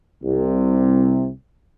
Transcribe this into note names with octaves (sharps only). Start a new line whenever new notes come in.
C2 C3